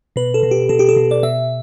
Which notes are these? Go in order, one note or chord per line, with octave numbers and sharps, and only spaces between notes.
B2 B4
A4
B2
G4
B2 A4
G4
A4
B2
D5
B2 E5